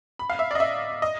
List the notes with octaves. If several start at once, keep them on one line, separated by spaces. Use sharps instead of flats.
B5
F5
E5
D5
D#5
E5
D#5